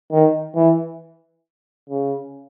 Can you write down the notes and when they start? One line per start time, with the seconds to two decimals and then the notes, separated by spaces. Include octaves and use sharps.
0.11 D#3
0.55 E3
1.90 C#3